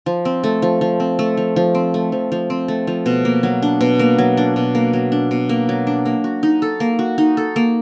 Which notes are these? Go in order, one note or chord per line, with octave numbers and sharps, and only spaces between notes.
F3
C4
A3
F3
F3
C4
A3
F3
F3
C4
A3
F3
F3
C4
A3
F3
B2
A#3
F#3
D4
B2
A#3
F#3
D4
B2
A#3
F#3
D4
B2
A#3
F#3
D4
A#3
F#4
D#4
A4
A#3
F#4
D#4
A4
A#3